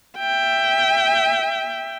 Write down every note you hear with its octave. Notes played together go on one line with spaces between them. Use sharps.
E5 G5